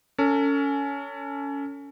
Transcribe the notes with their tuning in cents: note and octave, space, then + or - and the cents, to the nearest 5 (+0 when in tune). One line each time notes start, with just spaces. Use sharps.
C#4 +20 A4 +35